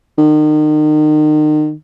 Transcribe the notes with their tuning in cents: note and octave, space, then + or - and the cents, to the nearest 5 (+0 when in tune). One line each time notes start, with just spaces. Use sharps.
D#3 -35